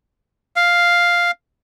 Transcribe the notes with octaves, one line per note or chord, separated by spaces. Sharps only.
F5